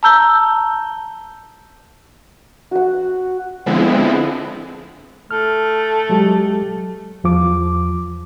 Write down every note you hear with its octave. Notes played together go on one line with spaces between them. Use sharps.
A5 A#5 E6 G6 G7
F#4 F#5
D3 F3 G#3 B3 C4 E4
A3 F6
F#3 G#3 G4
E2 F3 D6